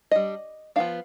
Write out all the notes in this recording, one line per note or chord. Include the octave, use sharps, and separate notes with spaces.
G3 D4 D#5
F3 B3 D4 F5